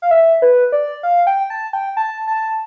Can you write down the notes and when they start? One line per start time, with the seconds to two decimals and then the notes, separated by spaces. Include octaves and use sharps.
0.02 F5
0.11 E5
0.42 B4
0.72 D5
1.03 F5
1.27 G5
1.50 A5
1.73 G5
1.97 A5
2.27 A5